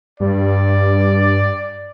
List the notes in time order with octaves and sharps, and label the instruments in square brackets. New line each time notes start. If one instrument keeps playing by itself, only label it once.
[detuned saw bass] G2 [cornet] D5